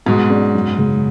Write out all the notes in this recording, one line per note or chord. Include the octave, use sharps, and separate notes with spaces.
G#2 B2 F#3
C#4 G#4 D5
F#2
C#3 G#3